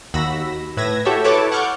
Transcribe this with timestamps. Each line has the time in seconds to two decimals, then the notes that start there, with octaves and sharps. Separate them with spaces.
0.14 D#2 F#4 B5 E6 A#6
0.77 A2 B4 E6 G#6 A#6
1.05 E4 F#4 G4 A4 C#5 E5
1.24 E4 A4 B4 C#5 A5 D6
1.52 F#5 C#6 D6 F6 G6